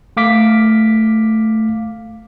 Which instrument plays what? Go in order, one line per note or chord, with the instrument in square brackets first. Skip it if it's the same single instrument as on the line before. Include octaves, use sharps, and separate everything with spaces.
[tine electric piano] A3 F5 D6 B6